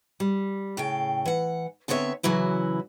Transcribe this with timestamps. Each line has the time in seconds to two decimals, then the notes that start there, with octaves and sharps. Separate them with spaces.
0.20 G3
0.77 A2 C#3 F5 G5
1.26 E3 F#5
1.88 D3 B3 C4 C#5 D5 E5
2.23 C#3 E3 F#3 E4 F#4